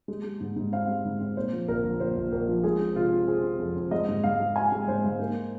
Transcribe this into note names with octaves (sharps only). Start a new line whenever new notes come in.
G#3
G#3
G#2
G#2
C4 F5
G#3
G#2
C4
A#2 C5
F3
A#1 A#4
A#1
A#1 C5
A#1
A#1 A#4
F3
G#3 G#4
C4
C3 F4
C4
C4 G#4
C4
F2
C4
G#3 D#5
G#2
G#2 F5
G#3
C4 G#5
G#3
G#2 C5
G#2
A#3